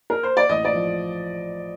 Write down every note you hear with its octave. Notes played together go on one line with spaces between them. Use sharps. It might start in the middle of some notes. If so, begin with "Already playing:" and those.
A#4
C5
D5
A1 D#5
D5
F3